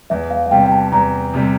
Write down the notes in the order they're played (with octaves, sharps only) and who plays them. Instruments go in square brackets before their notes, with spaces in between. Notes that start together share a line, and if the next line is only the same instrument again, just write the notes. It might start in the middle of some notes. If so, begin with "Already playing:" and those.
[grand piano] E2 [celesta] E5
[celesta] F5
F5
[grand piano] C3 G3 [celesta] G5
[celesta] G5
A5
[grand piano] E2 [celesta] A#5
[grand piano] C3 G3